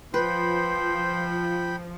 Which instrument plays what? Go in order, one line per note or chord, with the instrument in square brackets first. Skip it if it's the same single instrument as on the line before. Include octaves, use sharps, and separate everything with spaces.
[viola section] F3 [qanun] B4 [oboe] C5 [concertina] G5 B5